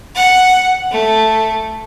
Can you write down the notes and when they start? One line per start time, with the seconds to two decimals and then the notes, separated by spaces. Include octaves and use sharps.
0.15 F#5
0.92 A3